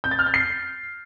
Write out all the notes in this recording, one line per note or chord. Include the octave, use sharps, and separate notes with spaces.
G6
A6
F6
G6
C7